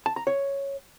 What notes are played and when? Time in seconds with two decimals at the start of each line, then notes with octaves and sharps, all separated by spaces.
0.06 A5
0.16 A#5
0.27 C#5